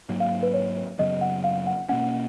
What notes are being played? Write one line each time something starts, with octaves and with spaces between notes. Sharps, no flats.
G#2 F#3 A#3
F5
B4
C#5
F#2 C#3 F#3 B3 D#5
F#5
F5
F#5
B2 A#3 C#4 F#5